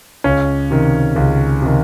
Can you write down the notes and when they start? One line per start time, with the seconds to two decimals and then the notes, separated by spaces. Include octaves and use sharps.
0.24 C#2 C#4
0.71 C3 D#3
1.16 C#2
1.62 C3 D#3